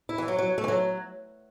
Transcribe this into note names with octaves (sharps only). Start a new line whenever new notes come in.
E4
E3
F#3
F#3
A3
E3
F#3